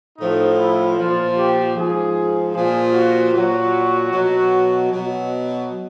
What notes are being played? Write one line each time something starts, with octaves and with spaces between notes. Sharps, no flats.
A2 F3 D#4
E4
A#2 F3 F4
G4
G#2 F3 G#4
A#2 F3 G#4
F#4
A#2 F#3 F#4
B2 F#3
B2 F#3